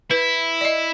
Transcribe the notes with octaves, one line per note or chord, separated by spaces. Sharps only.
E4 B4
D5 D#5